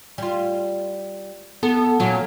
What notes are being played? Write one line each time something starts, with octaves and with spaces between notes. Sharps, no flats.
G3 F4
B3 A4
A#2 F#3 C#4 F#4